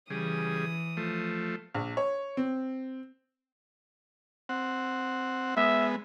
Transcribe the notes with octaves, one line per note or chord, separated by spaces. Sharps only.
C#3 E3 G3 G#4 D#6
F3 A3
A#1
C#5
C4
C4 F#5
G#3 B3 E5